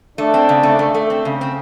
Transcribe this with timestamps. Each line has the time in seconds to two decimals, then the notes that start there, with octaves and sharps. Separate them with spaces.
0.18 A3 D4
0.34 C4
0.49 C#3
0.63 A3
0.79 A3
0.94 A3
1.10 C4
1.25 C#3
1.41 C4